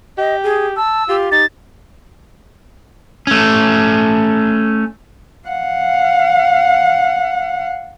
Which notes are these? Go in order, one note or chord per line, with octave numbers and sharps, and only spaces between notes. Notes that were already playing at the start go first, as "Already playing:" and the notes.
G4 D#5
G#4
A5 E6
F4 G4
D#4 A6
A3 C#4
F5 F#5